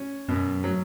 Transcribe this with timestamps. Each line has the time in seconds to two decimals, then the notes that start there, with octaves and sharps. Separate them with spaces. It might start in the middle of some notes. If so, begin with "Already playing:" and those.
Already playing: C#4
0.28 F#2 B2
0.64 F#3